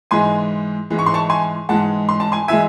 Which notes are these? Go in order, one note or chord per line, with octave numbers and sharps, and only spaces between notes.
G#2 E3 G#3 G#5 C6
G#2 E3 G#3
C#6
C6
A5 C#6
G#5 C6
G#2 E3 G#3 F#5 A5
C6
A5
G#5 C6
E3 G#3 E5 G#5